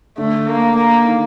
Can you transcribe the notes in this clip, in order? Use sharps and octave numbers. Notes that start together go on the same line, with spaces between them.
D3 A3
A#3
A#3
D#3